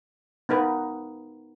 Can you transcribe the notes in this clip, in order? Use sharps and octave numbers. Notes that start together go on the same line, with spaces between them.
B3 D#4 A#4 B4